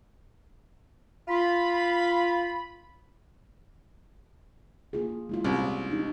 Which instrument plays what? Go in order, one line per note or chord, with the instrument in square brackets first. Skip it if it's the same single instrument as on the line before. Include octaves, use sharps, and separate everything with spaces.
[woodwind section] F4 B5
[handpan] A#3 F4 G#4
G#3 E4 F4
[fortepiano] C2 [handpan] C#4 G4
[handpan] D4 D#4 G4